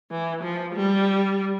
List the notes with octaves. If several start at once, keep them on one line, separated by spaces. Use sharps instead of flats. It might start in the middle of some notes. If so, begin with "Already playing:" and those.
E3
F3
G3